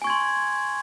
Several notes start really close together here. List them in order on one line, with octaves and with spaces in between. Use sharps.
G#5 C#6 G#6 C6